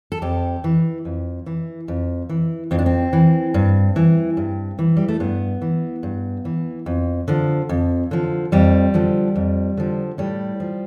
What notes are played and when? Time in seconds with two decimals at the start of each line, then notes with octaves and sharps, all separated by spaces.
0.12 A4
0.22 F2 G4
0.64 E3
1.05 F2
1.46 E3
1.88 F2
2.29 E3
2.71 F2 C4
2.79 D4
2.86 C4
3.13 E3
3.54 G2
3.96 E3
4.37 G2
4.79 E3
4.97 G3
5.08 A3
5.20 G2 B3
5.62 E3
6.03 G2
6.45 E3
6.86 F2
7.28 D3 F3
7.69 F2
8.11 D3 F3
8.52 F2 G3
8.94 D3 F3
9.36 F2
9.77 D3 F3
10.18 A2 G3
10.60 F3